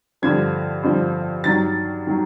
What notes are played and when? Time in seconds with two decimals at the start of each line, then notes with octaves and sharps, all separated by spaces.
0.22 G2 D3 F3 G#6
0.83 G2 D3 F3
1.44 G2 D#3 F#3 A6
2.07 D#3 F#3